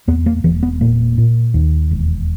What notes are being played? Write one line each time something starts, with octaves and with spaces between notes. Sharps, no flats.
E2 B3
A#3
E1 E3
B3
A#2 A#3
A#2
D#2
E1